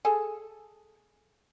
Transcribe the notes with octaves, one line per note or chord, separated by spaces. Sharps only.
G#4 A4